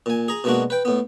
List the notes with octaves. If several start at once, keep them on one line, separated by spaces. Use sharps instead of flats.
A#2 G#5
G#4 A#5
B2 G#3 A#3 D4 F#4
B4 G5
A2 B3